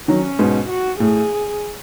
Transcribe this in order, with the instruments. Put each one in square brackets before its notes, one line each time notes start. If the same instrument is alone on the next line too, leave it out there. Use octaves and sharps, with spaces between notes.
[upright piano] D#3 F#3 [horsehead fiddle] C#4
[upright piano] G#2 B2
[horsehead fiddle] F#4
[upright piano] A2 [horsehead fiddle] G#4